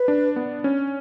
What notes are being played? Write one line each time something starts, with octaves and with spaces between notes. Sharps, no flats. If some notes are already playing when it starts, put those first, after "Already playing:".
Already playing: B4
D4
B3
C#4